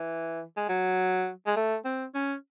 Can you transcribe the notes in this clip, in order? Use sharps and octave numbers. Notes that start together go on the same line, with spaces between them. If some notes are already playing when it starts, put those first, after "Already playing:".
Already playing: E3
G#3
F#3
G#3
A3
C4
C#4